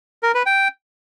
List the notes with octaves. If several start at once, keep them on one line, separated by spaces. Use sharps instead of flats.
A#4
B4
G5